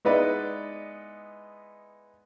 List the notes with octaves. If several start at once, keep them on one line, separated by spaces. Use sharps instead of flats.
G#3 B3 D#4 E4 B4 D5